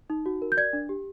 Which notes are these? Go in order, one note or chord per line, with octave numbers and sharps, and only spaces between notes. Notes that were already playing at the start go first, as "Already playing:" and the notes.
D#4
F#4
A#4
G6
D5 G#6
D4
G4